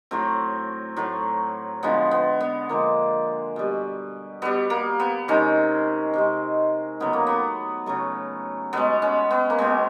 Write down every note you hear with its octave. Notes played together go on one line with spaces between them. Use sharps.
A2 F#3 A3 C4
A2 F#3 A3
D3 F3 G#3 B3
B3
B3
D3 F3 G#3 A#3
B2 G3
B2 G3 B3
A#3
B3
C3 D#3 G#3 C#4
C3 D#3 G#3
C#3 F#3 A3 B3
A#3
B3
C#3 F#3 A3
B2 G#3 B3
C#4
B3
A#3
B2 G#3 B3